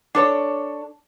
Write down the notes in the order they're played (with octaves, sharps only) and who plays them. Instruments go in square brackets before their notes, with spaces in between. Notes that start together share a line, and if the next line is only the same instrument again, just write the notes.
[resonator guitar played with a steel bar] D4 A4 C#5